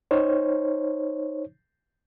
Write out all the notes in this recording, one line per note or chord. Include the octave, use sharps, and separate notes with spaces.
D#4 C5 C#5